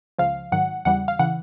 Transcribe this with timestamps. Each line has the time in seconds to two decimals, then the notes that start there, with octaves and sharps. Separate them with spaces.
0.18 C#2 C#3 F3 F5
0.52 G#2 D#3 F#3 F#5
0.85 E2 C#3 E3 G3 F#5
1.08 F5
1.19 C#3 E3 F#5